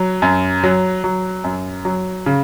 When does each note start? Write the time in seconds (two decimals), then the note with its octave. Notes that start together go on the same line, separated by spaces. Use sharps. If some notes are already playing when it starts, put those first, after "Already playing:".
Already playing: F#3
0.22 F#2
0.64 F#3
1.04 F#3
1.44 F#2
1.85 F#3
2.26 C#3